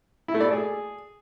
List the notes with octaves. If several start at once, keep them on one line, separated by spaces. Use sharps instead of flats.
E4
A3
D5
A4
G#4